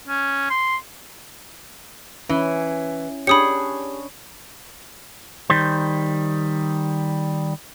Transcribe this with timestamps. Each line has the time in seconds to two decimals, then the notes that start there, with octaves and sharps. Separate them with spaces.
0.08 C#4
0.50 C6
2.29 E3 C#4
3.27 D4 G4 G#4 C#5 B5 D#6 C#7
5.50 D#3 G3 C5